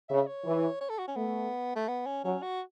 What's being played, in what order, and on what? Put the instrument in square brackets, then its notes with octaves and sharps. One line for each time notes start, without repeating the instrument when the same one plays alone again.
[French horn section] C#3 [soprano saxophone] E5
[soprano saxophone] C#5
[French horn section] E3
[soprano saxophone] C#5
A4
F#4
C#4
[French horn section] A3 [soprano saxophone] B3
[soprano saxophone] A3
B3
C#4
[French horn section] F#3 [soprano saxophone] C#4
[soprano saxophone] F#4